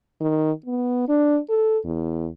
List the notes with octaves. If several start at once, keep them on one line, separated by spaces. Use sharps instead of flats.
D#3
B3
D4
A4
E2